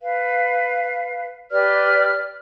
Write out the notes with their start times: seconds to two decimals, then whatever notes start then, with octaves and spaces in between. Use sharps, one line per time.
0.01 B4 F5
1.51 G4 B4 D5 F6